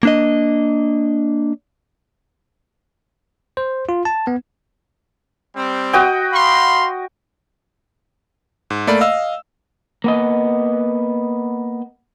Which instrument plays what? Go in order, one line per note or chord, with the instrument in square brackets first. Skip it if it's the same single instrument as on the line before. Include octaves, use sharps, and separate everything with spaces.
[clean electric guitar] A#3 D4 D#5
[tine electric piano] C5
F4
A5
B3
[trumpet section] G3 C4
[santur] F#4 D#5 G5
[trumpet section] F5 B5 C6
[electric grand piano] G#2
A3 A#3 D5 B5
D#5 F5 E6
[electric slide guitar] A#3 B3 D#5